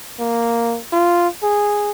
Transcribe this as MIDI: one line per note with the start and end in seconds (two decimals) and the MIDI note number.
0.19 0.78 58
0.92 1.28 65
1.43 1.91 68